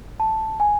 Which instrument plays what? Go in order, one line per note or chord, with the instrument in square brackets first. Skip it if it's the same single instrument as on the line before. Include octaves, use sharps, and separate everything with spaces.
[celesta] A5
G#5